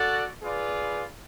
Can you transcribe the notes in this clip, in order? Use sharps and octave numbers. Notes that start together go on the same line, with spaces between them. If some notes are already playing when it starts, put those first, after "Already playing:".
Already playing: F#4 A4 D5 F#5
F4 G#4 B4 D5